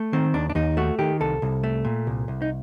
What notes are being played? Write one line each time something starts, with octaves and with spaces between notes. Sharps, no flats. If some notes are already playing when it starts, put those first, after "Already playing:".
Already playing: A3
D#3 C4
D#2 D4
D4
D#2 D#4
A3 F#4
D#3 G4
C2 A4
C2
A3
A#2
C2
C2
D#4